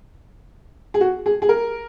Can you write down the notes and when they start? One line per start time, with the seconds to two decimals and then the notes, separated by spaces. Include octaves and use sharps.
0.94 G#4
1.01 F#4
1.26 G#4
1.42 G#4
1.49 A#4